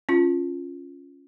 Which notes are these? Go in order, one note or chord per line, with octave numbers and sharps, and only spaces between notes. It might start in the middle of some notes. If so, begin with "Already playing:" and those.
C#4 F4